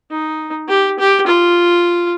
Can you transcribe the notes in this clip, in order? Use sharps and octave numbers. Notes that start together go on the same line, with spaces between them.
D#4
G4
G4
F4